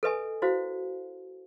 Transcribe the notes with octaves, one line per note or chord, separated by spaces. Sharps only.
A4 B4 D#5 G#5
E4 F#4 C5 F5